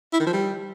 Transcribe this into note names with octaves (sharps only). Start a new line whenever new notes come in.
E4
D#3
F3
G3